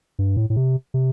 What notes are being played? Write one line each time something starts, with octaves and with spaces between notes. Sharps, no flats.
G2
A2
A2
C3
C3